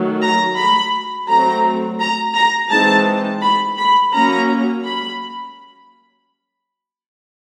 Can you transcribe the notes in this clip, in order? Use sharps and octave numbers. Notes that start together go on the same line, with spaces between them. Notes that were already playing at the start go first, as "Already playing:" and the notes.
Already playing: D#3 F#3 A3
A#5
B5
F#3 A3 C4 A#5
A#5
A#5
E3 G#3 C4 D#4 A5
B5
B5
F#3 A#3 C#4 A#5
B5